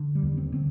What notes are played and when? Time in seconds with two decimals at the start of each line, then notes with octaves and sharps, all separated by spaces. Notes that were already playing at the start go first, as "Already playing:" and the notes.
Already playing: D3
0.15 G3
0.23 D#2
0.37 C4
0.52 D3 C4